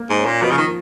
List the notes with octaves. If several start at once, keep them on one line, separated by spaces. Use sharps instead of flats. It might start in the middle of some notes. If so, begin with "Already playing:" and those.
Already playing: A#3
G#2
C#4
A#2
B2 F3
C#3
D#3